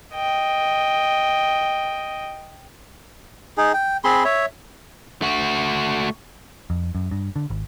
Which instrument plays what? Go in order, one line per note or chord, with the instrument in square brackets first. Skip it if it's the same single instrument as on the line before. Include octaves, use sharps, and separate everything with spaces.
[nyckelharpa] D#5 G5
[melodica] D#4 G#4
G5
C4 G#4 B5 C6
C#5 E5
[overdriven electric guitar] A3 F#4
[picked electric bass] F2
F#2
G2
D3
G#1